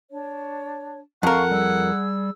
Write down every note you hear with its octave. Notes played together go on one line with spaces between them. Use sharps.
D4 C#5
F2 A#4 F5 F#5 C#6
G3 G#4 E6